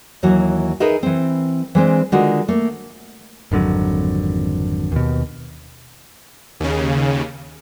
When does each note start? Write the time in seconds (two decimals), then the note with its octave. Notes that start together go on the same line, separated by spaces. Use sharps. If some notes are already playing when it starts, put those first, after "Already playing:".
0.23 D#2 E3 F#3 F#4
0.80 D#4 G#4 A#4 B4 D#5 E5
1.03 E3 C4
1.75 E3 G#3 C4 D4
2.12 D3 D#3 G#3 F4 F#4
2.48 A3 A#3
3.52 G#1 F2 D3 F#3
4.92 D#2 B2
6.60 D#2 C#3